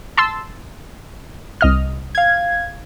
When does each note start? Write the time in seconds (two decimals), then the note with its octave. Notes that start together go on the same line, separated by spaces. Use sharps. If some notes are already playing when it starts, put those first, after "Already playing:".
0.17 A5 C6 E6
1.61 C2 D#5 F6
2.15 F5 G#6